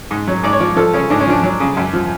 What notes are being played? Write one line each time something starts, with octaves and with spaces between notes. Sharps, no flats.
G#2
F#3
G#2 D5
C#5
F3 D5
F3 A4
C#3 C#4
G#2 D4
C#4
F3 D4
F#3
C#3
F#2
F3